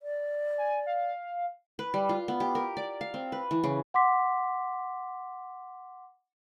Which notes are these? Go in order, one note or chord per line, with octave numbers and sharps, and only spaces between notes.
D5
G#5
F5
B4
G3
F4
B3
G4
A#4
D5
F5
C4
B4
E3
C#3
F#5 C6 D6 B6